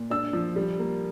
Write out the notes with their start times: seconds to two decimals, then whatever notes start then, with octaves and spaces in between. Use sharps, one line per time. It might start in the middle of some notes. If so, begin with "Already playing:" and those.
Already playing: A#2
0.10 D4 E6
0.33 F3
0.56 G3
0.79 A#3